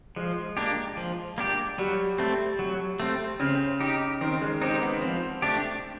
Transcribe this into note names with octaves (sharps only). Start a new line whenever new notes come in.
F3 G#3
A#3 D4 G4
F3
A#3 D4 G4
F#3 G3
A3 C4
F#3
A3 C4
C#3 C4
D#4 G4
D#3 C4
G#3
C4 D#4 G4
B3
F3 C4
A3 D4 G4